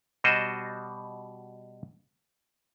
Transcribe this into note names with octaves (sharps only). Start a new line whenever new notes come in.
B2 G3 F#4 C5 D#5